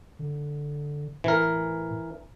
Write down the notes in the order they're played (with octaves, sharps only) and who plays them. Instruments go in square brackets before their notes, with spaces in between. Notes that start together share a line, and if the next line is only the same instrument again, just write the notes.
[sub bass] D3
[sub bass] A2 [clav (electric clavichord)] E3 A#4